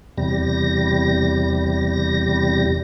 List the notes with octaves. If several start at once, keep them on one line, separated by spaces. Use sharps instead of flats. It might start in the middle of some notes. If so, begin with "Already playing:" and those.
E2 C3 G3 A#6